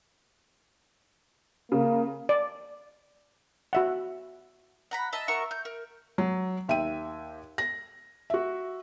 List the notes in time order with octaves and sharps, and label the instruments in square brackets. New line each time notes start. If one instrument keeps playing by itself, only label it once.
[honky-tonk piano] C#3 [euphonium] A#3
[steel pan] D5
F#4 E5 F#5
[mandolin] F#5 A#5 B5
D#5 E5 A5
F#4 A#4 E5 C#6
G6
A#4
[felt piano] F#3
D#2 E5 G5 D#7
A#6
F#4 E5